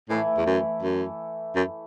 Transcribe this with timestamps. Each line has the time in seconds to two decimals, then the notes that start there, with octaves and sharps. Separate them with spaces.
0.10 A2 E3 A3 E4
0.38 E2
0.47 F#2
0.83 F#2
1.55 F#2